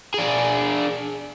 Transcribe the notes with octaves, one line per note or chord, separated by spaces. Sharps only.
D4 G#4